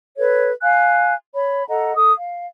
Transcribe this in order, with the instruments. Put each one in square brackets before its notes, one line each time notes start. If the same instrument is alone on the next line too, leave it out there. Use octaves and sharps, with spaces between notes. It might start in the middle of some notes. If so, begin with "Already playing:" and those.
[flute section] A4 B4 C#5
F5 G#5 F#6
C#5 B5
A4 D#5 F#5 A#5
A4 D#6
F5